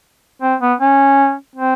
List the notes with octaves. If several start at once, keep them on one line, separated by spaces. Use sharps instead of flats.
C4
B3
C#4
C4